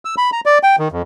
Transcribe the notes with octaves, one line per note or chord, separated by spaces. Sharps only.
E6
B5
A#5
D5
G5
D#3
F2